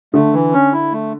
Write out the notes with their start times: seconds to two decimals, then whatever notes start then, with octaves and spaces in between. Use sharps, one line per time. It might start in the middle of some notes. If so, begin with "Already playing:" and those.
0.14 D3 A3
0.33 E3
0.53 C#4
0.72 E4
0.92 A3